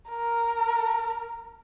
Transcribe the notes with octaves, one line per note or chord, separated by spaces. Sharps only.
A#4